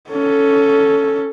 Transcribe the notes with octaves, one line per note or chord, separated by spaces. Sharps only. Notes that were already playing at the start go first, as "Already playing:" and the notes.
C#4 A4